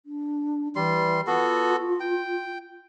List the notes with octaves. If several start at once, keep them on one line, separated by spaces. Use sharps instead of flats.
D4
E3 G3 C6
B3 F4 F#4 A4
G5